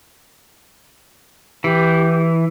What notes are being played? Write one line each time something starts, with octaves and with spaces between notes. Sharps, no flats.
E3 G4